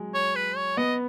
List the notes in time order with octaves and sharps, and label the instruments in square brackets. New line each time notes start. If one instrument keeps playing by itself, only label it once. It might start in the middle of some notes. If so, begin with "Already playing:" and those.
Already playing: [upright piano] F#3 G#3
[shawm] C#5
B4
C#5
[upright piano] B3 [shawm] D#5